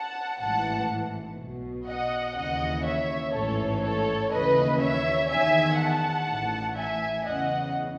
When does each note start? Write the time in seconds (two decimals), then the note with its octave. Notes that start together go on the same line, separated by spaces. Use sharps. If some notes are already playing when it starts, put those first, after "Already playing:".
Already playing: F#5 A5
0.40 A1 G#2 E3 F#5 A5
1.38 B1 B2
1.87 D#5 F#5
2.36 D#2 C#3 E3 D#5 F#5
2.85 C#5 E5
3.34 A1 G#2 E3 A4 C#5
3.83 A4 C#5
4.32 D#2 C#3 E3 B4 D#5
4.81 C#5 E5
5.30 E2 D#3 E5 G#5
5.79 F#5 A5
6.28 A1 A2 E3
6.77 E5 G#5
7.25 E2 C#3 E3 D#5 F#5